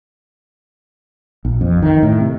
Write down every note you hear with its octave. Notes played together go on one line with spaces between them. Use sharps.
A#1
F2
D#3
A2
C3